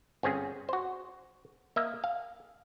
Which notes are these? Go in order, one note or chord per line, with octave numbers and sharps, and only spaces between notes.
G1 C4 C#4 G#4
F#4 C5
A#3 D#5 E5
F5